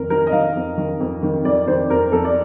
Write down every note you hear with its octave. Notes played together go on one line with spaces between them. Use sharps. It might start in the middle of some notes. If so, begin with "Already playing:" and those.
Already playing: F2 D#3 A#4
D#3 A#4
D#5
D#3 F5
F2
D#3
F2
D#3
F2 D5
D#3 C5
F2 A#4
F2 A4
D5